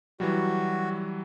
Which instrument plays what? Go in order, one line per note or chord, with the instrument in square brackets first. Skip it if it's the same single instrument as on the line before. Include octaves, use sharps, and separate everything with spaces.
[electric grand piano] E3 F#3 G3 [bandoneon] F#4